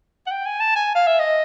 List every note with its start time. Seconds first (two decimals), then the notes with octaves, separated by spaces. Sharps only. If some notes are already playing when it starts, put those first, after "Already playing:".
0.27 F#5
0.31 G5
0.46 G#5
0.60 A5
0.76 G#5
0.95 F5
1.07 E5
1.19 D#5